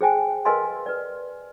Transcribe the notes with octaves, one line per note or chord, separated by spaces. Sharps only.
G#4 C5 G5 G#5
A#4 B4 D#5 F5 G#5 C6
B4 D5